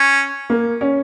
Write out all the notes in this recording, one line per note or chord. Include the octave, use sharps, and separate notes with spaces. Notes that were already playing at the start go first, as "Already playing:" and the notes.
Already playing: C#4
A#3
C#4